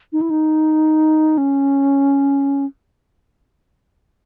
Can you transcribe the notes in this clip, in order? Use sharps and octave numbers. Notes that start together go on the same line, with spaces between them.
D#4
E4
D#4
C#4